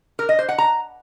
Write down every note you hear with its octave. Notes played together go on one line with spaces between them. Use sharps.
A#4
D#5
C5
F#5
A#5